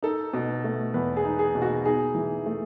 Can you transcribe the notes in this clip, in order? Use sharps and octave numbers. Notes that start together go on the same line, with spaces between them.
D#4 A4
B2
A3
E2 B4
G#4
D#4
G#4
B2
F#4
D#4 G#4
E3
A3